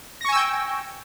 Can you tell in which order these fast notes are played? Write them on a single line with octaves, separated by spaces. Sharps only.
A#6 C#6 G#5 E6 G5